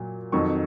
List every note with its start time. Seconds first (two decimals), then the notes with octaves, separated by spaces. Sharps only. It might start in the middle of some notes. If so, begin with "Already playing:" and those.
Already playing: A#2 F#3
0.32 F2 D#3 F#3 C#6